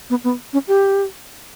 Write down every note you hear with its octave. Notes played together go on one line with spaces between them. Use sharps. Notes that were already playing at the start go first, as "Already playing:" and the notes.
B3
B3
C#4
G4